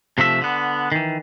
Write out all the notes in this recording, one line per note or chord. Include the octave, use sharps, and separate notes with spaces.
C3 F3 A3 E5
D3 B3
D#3 E3